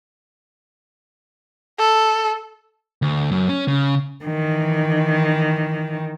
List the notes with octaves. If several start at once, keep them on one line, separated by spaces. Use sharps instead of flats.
A4
D2
F#2
C#4
C#3
D#3 E3